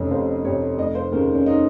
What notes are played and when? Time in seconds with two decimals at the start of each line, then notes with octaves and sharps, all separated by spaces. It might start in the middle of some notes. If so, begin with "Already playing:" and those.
Already playing: F1 F2 C3 C#4
0.11 F1 C5
0.44 F2 C3 C#5
0.78 F1 D#5
0.95 C5
1.12 D#2 C#3 A#4
1.35 C#4
1.46 D#4